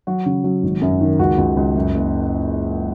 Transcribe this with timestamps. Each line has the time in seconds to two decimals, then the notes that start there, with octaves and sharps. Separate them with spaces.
0.07 F#3 F#4
0.26 C#3
0.44 F#3
0.63 G#1
0.82 F#2
1.00 D#3
1.19 C#2 F#4
1.38 C#2
1.57 C#2
1.76 F#2
1.94 F#1